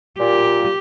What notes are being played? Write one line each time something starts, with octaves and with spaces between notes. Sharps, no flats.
A#2 G4